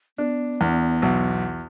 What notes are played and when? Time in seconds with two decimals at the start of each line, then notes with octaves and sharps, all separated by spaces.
0.18 B3 D4
0.61 E2
1.02 B1